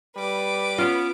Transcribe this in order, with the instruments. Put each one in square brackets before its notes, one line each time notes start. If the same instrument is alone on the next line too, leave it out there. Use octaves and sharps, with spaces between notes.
[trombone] G3 [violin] B4 D6
[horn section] B3 C#4 [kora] F4